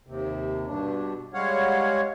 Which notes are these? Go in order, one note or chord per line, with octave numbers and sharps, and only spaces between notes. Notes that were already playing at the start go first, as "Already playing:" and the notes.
D#2 C3
G2 B2 D4
G3 G#3 C#5 F5 F#5